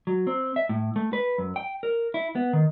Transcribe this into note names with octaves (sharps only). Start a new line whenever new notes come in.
F#3
C4
E5
A2
A3
B4
F#2
G5
A#4
E4
B3
D#3